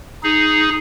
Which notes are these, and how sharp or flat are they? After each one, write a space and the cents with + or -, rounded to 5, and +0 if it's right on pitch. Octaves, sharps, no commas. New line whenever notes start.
D#4 +0 G#4 +0